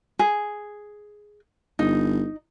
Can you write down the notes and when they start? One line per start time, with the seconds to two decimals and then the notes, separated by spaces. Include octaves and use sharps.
0.19 G#4
1.79 G1 D#4